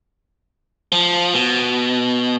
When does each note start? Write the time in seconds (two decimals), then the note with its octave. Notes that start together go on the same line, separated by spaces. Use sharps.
0.92 F3
1.33 B2